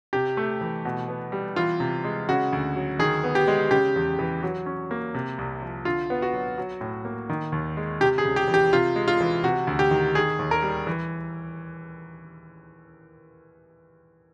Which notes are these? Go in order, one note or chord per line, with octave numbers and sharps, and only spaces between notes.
C3 G4
A3
E3
B2
B3
G3
E3 F4
C3
G#3
C#3 F#4
D2
F#3
D#3 G#4
B3
G4
G#3
C#3 G4
E2
E3
F#3
C#4
A#3
C3
C2
F3
D3 F4
B3
F#4
F#3
F#3
A2
A#3
D#3
D#2
G#3
C3 G4
G#4
C#2
G4
E3
G4
C3 F4
G#3
F4
E3
C3 F#4
D2
G4
D#3
D#3 G#4
D#2
A#4
G3
E3